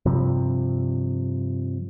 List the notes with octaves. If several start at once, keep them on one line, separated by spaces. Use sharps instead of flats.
G2 C3 F3